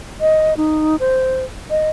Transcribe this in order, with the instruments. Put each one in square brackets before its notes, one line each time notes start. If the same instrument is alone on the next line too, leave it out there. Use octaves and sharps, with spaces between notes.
[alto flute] D#5
D#4
C5
D#5